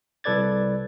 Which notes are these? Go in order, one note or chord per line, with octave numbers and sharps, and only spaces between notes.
C2 A4 B4 D5 G#6 A6